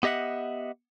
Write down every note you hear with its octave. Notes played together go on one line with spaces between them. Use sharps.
B3 G4 D#5 E5 F#5